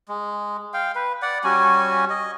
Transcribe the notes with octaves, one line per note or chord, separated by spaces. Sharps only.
G#3
F5 G5
B4
D5 F#5
G3 C#4 F#4 G#5
D#5